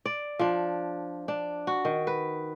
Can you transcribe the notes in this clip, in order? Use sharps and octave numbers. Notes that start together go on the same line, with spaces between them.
D5
F3 D4
D4
F#4
D#3
B4